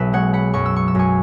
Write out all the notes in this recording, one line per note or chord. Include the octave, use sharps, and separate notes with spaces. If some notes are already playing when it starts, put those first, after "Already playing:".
Already playing: B1 B2 B4 E5
G#3 C#5 F#5
F#5 B5
F#2 C#6
E6
C#6
E6
F#2 G#5 C#6